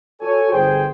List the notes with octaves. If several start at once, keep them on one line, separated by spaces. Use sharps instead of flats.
F#4 A4 C#5 G#5
G1 G#4 C5 G5